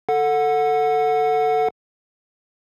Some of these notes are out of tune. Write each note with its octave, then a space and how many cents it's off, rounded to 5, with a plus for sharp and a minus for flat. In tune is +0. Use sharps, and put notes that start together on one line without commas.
A4 +10 F#5 -15